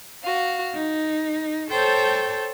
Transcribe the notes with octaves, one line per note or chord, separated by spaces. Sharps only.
F#4 F5
D#4
A4 C5 C#5 G5 A5